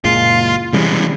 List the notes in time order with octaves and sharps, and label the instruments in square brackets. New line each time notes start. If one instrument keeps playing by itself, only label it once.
[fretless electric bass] F#1 A#2 G#3 [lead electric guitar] F4
[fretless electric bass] C3 G3 C#4 [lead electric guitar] E3 G#3